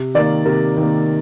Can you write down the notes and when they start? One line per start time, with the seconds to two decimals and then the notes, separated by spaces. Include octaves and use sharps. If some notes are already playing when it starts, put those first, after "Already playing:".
Already playing: C3
0.15 D#3 A#3 D5
0.45 C3 A#4
0.77 D#3 A#3